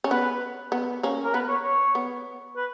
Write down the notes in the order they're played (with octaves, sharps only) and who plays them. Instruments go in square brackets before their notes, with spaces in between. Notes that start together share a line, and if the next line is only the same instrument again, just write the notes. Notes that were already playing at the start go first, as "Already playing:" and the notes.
[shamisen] C#4
[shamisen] B3 [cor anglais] B4
[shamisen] B3
A#3 C#4
[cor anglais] A#4
[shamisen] B3 [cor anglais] B4
[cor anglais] C#5
C#5
[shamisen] B3
[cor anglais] B4